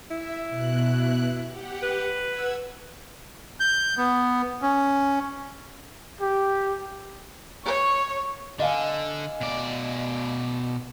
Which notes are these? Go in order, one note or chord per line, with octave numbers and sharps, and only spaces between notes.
E4 E5
B2 F#6
G4 F#5
B4
F#5 E6 G#6
G6
B3
C#4
G4
C#5 C#6
D3 D#5 F5 G#5
B2 D5